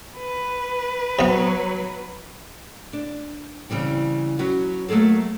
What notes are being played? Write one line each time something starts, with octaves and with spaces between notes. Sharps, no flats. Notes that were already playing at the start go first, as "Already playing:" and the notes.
B4
C3 F#3 B3
D4
C#3 E3 G3 C4
F#3 C#4 F#4 B4
F#3 A3 A#3 G#4 A4